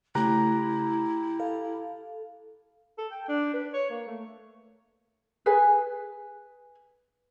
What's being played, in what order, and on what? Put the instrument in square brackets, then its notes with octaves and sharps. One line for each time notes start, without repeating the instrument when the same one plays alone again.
[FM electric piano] C#3 A3 [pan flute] E4 [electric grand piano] G4 A#5 F#6
[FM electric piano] A4 F5
[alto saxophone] A4
G5
D4
B4
C#5
A#3
A3
[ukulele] G#4 B4 G#5